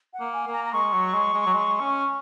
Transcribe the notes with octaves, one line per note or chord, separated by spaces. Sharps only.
F#5
A#3
G#5
A#3
A#5
A#5
G#3 C#6
F#3
G#3
G#3
F#3
G#3
C#4